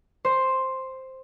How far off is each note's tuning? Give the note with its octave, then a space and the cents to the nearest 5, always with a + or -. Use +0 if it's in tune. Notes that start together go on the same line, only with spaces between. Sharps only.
C5 +5